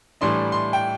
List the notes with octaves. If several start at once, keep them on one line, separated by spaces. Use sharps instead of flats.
A2 E3 G3 D4 C6
C6
G5